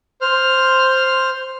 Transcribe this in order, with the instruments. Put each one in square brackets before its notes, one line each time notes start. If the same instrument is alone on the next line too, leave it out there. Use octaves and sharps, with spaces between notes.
[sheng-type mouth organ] C5 F6